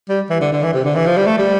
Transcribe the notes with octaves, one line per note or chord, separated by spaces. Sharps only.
G3
E3
D3
D3
E3
C3
D3
E3
F3
G3
A3
G3